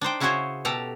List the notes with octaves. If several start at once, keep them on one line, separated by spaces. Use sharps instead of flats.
D4 D#4 C5 G5
C#3 E4 F#4 G#4 C5 C#5
B2 G4 A4 A5 A#5